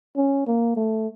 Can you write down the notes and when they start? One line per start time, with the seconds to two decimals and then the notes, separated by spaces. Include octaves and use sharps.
0.17 C#4
0.47 A#3
0.76 A3